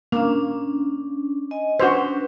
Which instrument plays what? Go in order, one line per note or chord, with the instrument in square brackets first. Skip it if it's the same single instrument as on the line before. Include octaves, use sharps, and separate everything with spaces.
[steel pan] A#3 [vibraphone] C#4 D4
[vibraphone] D#5 G#5
[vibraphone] C#4 D4 B4 [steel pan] F#4 C5